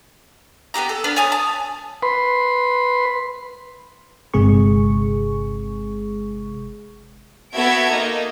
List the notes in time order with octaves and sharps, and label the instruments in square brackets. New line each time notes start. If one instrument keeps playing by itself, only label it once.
[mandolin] B3 C4 G4 A#5
A4
B3 D4 A#4 B4
C#5 G#5 A5 D#6
A5
[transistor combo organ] B4 B5 C6
[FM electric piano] G1 C3 G#3 G#4 C#6
[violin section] B3 F#4 A4 E5 G#6 D7
A#3 D#4 D#5